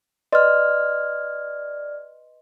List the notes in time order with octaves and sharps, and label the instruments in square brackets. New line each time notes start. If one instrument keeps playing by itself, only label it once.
[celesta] B4 D#5 C6 [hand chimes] D5 F6